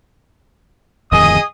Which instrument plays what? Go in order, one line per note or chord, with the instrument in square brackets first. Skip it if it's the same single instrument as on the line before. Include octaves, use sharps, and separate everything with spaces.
[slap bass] D1 F2 D#3 [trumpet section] G#4 D#5 D#6